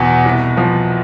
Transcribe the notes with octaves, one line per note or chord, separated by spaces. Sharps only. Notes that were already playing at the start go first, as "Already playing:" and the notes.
Already playing: E2 B2 F#5
C2
F3